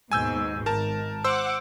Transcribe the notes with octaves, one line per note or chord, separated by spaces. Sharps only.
D#2 G#2 B2 G#5 E6 G6
G#1 A#4 A5
C5 F#5 D6 E6